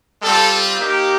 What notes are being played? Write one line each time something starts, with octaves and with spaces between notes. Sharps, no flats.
G3 C4 F4 A4
A#3 D#4 G4